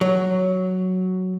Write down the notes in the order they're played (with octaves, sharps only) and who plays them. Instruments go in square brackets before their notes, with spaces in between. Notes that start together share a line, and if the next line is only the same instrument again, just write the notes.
[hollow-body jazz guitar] F#3